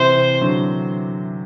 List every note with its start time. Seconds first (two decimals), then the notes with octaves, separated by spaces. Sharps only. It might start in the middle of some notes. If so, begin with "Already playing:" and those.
Already playing: C3 E3 C5
0.41 D3 F#3